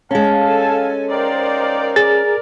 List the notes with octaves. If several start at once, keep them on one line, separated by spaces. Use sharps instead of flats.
G#3 C#4 F5 A5
A4 G#5
D#4 A#4 C5 D5 F5 G5
G#4 A#4 D5 A6